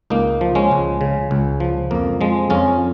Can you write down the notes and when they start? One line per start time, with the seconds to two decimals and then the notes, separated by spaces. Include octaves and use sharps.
0.10 C#2 A#3 D#4
0.41 F3
0.55 G#3 C#4
0.71 C#2
1.01 C#3
1.31 C#2
1.60 F3
1.91 F2 A#3
2.21 F3 G#3
2.50 F2 C#4 F4